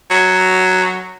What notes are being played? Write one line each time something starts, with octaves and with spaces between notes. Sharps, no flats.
F#3